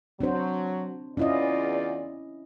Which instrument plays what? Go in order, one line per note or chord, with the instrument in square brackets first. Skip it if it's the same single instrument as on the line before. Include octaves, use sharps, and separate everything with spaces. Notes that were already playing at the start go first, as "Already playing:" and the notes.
[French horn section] F#3 [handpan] C4 D4 C5
[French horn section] E2 F4 D5 [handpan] C#4 E4 D#5